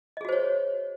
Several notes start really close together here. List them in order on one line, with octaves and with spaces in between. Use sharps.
D#5 G#4 F#4 C5 C#5